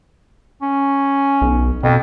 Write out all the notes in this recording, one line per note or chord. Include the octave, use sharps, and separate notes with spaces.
C#4
B1
F2 B2